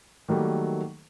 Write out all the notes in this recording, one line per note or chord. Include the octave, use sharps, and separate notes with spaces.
D#3 F#3 G3 A3 A#3